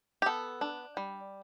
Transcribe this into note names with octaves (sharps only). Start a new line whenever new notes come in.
G4
B3 A4
D4
G3